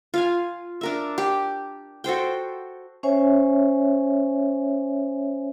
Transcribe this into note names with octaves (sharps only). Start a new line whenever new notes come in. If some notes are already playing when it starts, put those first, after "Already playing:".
F4 F5 G#5
D4 A#4 E5
G4
F#4 A4 C5 G5
C#4 C5 C#5 E5 G#5